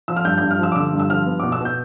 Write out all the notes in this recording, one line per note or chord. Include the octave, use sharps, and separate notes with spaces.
F3 E6
F6
G2 G6
G2 G6
F6
F3 E6
D6
D3 E6
G2
E6
F3 F6
B3
B2 D6
E6
B2 G6